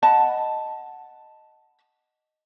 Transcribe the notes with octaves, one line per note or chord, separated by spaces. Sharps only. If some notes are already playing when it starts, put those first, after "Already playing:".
D#5 F#5 A5 B5